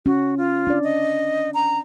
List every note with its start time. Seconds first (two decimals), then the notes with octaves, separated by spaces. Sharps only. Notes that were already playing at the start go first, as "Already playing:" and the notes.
0.06 C#4 F#4
0.37 F4
0.67 D4 D5
0.84 D#5
1.54 A#5